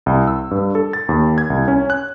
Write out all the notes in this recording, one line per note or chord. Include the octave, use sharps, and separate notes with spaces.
C2
E6
G2
A4
A6
D#2
G#6
C2
C#4
F#6